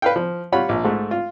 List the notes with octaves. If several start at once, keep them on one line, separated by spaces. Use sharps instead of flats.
B4 F5 G5
F3
G3 F4 C#5 F#5 B5
A#1
G#2 G#3 A3
F4